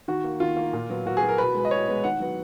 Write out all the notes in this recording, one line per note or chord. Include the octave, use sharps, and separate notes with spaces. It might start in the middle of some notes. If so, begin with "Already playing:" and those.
D#3 F#4
A#3
D#3 F4
A#3
A#2
F#3 B3
A#2 F#4
G#4
F#3 B3
A#4
B2 B4
G#3 B3
D#5
B2 C#5
G#3 B3
D#3 F#5
F#3 B3